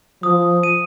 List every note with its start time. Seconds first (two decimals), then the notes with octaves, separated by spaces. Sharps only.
0.23 F3 D#6
0.63 D#7